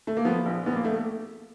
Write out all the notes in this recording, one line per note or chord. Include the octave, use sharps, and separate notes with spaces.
A3
A#3
F3 B3
A#1
A#1 B3
A#3
A3